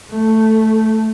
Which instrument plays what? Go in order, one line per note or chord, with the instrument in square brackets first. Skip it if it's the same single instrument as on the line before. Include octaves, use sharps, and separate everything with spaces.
[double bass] A3